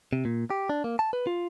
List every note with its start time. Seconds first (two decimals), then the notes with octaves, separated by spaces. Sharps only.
0.13 C3
0.25 A#2
0.50 G4
0.69 D4
0.84 A#3
0.99 A5
1.13 B4
1.27 F4